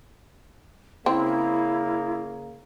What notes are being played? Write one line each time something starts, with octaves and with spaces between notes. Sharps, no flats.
C#3 A#3 C4 E4